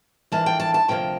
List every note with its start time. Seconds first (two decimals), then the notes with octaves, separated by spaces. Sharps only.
0.32 F2 E3 A#3 D4 A5
0.46 G5
0.60 A5
0.74 A5
0.88 D2 C3 F3 A#3 G5